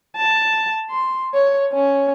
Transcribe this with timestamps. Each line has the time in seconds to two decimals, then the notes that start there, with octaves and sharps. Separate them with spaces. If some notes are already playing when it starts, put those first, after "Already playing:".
0.16 A5
0.90 C6
1.34 C#5
1.73 C#4